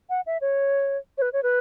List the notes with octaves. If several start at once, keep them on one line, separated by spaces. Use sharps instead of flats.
F#5
E5
C#5
C#5
B4
C#5
B4